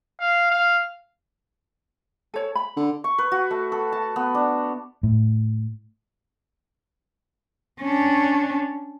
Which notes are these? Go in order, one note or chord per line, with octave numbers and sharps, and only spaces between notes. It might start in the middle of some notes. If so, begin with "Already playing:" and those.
F5
F5
A4 C#5
B5
D3
C#6
B4
F#4
A3
A4
A5
B3
D4
A2
C#4 D4